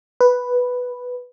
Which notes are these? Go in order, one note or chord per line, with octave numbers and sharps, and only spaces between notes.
B4